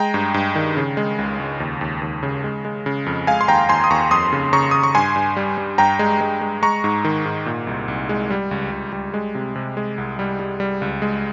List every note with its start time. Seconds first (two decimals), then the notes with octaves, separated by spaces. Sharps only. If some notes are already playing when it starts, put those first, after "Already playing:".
Already playing: G#3 G5 A#5
0.14 G2
0.34 G2
0.56 D#3
0.77 C#3
0.97 G#3
1.19 C#2
1.40 C#2
1.60 D#2
1.81 D#2
2.02 D#2
2.23 C#3
2.44 G#3
2.65 G#3
2.86 C#3
3.06 F2
3.27 G#3 F5 G#5
3.41 C6
3.48 D#2 G5 A#5
3.69 D#2 G#5 C6
3.84 D#6
3.90 D#2 A#5 C#6
4.11 F2 C6 D#6
4.33 C#3
4.53 C#3 A#5 C#6
4.71 C#3 D#6
4.83 C#6
4.95 G2 G#5 C6
5.16 G2
5.37 G3
5.58 G3
5.78 G2 G5 A#5
5.99 G#3
6.21 G#3
6.41 G#3
6.62 G#3 A#5 C#6
6.84 G#2
7.05 D#3
7.25 G#2
7.46 A#2
7.67 C2
7.88 C2
8.09 G#3
8.30 G3
8.51 C#2
8.72 C#2
8.93 G3
9.14 G#3
9.35 C3
9.56 C3
9.77 G#3
9.98 C2
10.19 G3
10.39 G3
10.60 G3
10.82 C#2
11.02 G#3